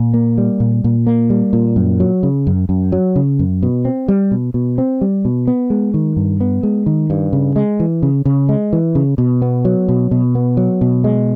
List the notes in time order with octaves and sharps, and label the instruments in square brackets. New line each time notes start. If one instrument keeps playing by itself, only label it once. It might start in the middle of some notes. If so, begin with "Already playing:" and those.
Already playing: [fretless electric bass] A#2
A#3
G3
A#2
A#2
A#3
G3
A#2
F#2
F#3
C#3
F#2
F#2
F#3
C#3
F#2
B2
C4
G3
B2
B2
C4
G3
B2
B3
G#3
D#3
G2
B3
G#3
D#3
G2
C#3
G#3
E3
C#3
C#3
G#3
E3
C#3
B2
B3
F#3
B2
B2
B3
F#3
B2
G#3